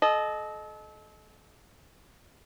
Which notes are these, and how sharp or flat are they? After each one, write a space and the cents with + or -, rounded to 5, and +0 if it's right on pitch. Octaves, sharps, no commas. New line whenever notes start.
A4 -35 D#5 -10